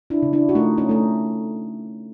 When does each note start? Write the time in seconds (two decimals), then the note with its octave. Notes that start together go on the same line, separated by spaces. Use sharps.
0.10 D4 E4
0.22 C#3
0.33 D4 E4
0.49 F#4
0.55 A3 D#4 F4
0.78 C#4 D#4
0.89 A3 D#4